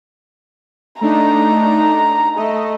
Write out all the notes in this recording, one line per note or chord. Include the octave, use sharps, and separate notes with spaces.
A3 D4 D#4 A#5
A3 D#5